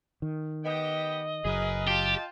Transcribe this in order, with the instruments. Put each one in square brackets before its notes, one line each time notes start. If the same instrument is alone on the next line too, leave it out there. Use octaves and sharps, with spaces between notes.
[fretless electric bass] D#3
[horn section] B3 G4 G5 [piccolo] D#5
[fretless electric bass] F#1 F#3 [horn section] G#4 A#4 B4
[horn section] F4 G5 A5 [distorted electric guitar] G4